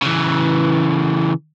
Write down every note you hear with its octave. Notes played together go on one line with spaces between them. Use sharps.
C#3 E3